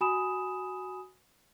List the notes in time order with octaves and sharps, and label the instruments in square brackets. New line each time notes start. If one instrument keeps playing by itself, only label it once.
[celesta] F#4 G#5 B5 D#6 E7